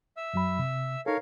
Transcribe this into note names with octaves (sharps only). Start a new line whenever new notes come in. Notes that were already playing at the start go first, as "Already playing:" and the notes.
E5 E6
F#2 F#3 B5
C3
D#4 A4 A#4 C#5 F5